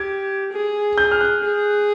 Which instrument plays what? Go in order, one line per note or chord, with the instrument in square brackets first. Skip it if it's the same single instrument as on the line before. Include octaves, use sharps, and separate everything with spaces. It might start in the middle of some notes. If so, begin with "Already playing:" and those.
Already playing: [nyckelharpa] G4 [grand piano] G#6
[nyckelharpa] G#4
[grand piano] G6
F6
F#6
[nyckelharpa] G#4